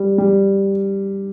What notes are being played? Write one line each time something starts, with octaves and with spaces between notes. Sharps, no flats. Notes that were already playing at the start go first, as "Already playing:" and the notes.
Already playing: G3
G3